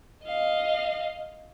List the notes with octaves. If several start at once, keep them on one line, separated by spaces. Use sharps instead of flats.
D#5 F5